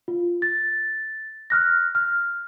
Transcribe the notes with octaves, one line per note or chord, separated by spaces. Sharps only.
F4
A6
F6 F#6 A#6
F6